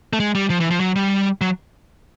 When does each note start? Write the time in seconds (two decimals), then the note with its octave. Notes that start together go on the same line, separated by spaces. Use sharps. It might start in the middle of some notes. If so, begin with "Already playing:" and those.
0.13 A3
0.20 G#3
0.35 G3
0.50 F3
0.60 E3
0.71 F3
0.80 F#3
0.96 G3
1.41 F#3